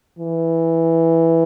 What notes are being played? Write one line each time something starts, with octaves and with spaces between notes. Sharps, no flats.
E3